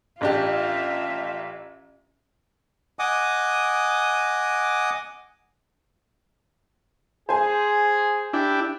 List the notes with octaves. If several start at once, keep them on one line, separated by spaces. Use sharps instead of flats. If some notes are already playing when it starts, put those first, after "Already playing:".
A1 D4 F4 G4 E5
D#5 F#5 G#5 D6 D#6
G#4 C5 G#5
D4 E4 G4